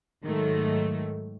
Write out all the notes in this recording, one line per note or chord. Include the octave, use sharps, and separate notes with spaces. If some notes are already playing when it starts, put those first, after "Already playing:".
G#2 D#3 F#3 A3